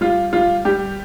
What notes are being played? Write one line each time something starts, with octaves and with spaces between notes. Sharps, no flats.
G3 F4
G3 F4
G3 G4